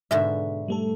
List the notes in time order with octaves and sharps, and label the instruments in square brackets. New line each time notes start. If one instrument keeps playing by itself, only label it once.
[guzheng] G#2 B2 D3 [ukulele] E5
[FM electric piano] G3 A3 A4